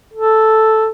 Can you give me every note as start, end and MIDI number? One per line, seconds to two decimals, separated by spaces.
0.13 0.89 69